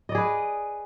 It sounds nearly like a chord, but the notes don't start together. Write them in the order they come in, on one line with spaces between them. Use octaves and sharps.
D#5 D5 G#4 B4